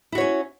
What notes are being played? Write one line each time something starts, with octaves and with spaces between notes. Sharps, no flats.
C#4 E4 F#4 C#5